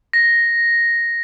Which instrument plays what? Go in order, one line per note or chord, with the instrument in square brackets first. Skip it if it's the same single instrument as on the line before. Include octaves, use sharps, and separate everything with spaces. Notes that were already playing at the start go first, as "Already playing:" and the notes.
[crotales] A#6